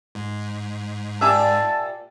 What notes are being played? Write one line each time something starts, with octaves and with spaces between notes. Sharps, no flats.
G#2
A#2 G4 E5 G#5 A5 E6